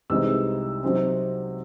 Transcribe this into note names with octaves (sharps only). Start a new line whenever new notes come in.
C2 C3 E3 G#3 D#4 E6
C3 F#3 C4 D#4